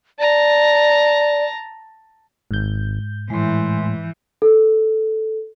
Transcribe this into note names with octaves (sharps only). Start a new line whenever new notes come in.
D5 A5 A#5
G#1 G#2 G6
A2 E3 G#3 C6
A4